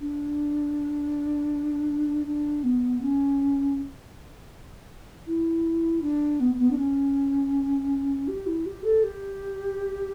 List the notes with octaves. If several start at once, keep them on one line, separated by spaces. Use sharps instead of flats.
D4
D4
B3
C#4
E4
D4
B3
B3
D4
C#4
G4
E4
G4
A4
G4